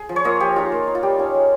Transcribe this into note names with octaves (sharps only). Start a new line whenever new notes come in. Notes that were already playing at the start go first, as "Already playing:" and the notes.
Already playing: G#4
F3
C#5
A#3 F4 D#5
F3 G4
G#3 D#4 F4
A#3
D#4
F4
G3 G4
C#4 F4
G#3